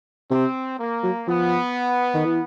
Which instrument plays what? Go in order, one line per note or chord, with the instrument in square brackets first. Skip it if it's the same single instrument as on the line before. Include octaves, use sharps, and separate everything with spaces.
[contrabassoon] C3 [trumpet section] C4
[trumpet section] A#3
[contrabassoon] F#3
[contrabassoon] F3 [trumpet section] B3
[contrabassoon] D#3
E3